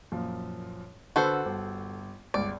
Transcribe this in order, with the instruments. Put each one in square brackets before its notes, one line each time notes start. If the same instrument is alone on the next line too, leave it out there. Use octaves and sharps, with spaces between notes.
[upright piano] F#2 A#2 F3
[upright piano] D3 B4 B5 [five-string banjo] F#4 A4 C5
[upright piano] G1
[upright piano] G1 C#2 [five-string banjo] D5